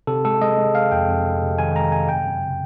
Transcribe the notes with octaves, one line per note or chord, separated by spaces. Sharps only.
C3 A4
G#3 A4
G#3 D#5
G#3
G#3 F5
F2 G5
F2
C3
C3
D#3 G#5
G#3 A#5
C3 G#5
F#2 G5
F#2
C#3